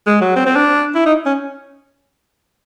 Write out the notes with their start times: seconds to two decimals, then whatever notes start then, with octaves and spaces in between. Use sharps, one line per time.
0.06 G#3
0.21 F#3
0.36 C4
0.46 C4
0.56 D4
0.95 E4
1.06 D#4
1.26 C#4